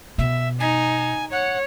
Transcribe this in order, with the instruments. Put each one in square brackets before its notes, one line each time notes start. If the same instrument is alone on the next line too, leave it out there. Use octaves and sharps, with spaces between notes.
[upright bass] B2 [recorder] E5
[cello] D#4 [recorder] G#5
[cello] C#5 [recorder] F#5